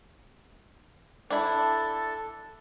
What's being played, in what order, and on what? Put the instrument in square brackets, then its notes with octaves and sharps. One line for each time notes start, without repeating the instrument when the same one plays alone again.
[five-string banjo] D4 E4 [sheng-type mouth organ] A4